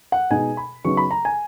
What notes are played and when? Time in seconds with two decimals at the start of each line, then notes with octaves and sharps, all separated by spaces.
0.12 F#5
0.31 B2 G#3 B3 D#4 G#5
0.57 B5
0.85 C#3 F#3 B3 D#4 C#6
0.97 B5
1.11 A#5
1.25 G#5